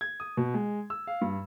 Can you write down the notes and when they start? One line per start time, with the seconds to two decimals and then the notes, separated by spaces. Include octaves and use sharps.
0.01 G#6
0.20 D#6
0.37 B2
0.54 G#3
0.90 E6
1.07 F5
1.21 G2